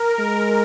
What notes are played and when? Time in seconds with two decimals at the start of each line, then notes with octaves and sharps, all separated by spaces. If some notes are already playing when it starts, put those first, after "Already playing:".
Already playing: A#4
0.20 G#3